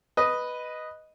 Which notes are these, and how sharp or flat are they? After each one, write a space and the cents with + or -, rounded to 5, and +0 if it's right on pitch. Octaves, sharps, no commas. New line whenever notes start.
B4 +0 D#5 +0